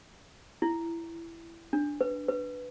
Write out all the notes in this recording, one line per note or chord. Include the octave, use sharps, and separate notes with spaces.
E4
D4
B4
B4